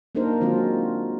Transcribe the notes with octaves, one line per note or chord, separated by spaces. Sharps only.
A#3 D4 D#4 A#4 C5
D#3 F#3 G#3 C4 D4 F4